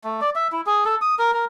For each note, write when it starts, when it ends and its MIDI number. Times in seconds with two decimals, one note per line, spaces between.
0.04 0.20 57
0.21 0.30 74
0.35 0.48 76
0.52 0.61 64
0.66 0.84 68
0.85 0.95 69
1.01 1.15 87
1.19 1.31 70
1.33 1.45 70